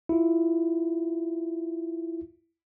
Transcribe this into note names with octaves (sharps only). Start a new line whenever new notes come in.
E4 F4